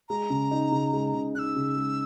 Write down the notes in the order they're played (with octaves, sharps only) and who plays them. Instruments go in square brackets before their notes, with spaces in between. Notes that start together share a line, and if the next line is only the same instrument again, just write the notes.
[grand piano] G#3 [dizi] A#5
[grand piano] C#3
D#4
C#3
G#3
C#3
[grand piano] D#4 [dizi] F#6
[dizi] E6
[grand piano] C#3
G#3